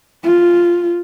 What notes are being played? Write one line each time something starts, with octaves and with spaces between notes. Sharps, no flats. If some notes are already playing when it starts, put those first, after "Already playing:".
F4